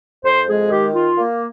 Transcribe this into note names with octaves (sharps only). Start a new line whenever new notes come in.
F2 C5
G#3 G#4
D#3 G4
F4
A#3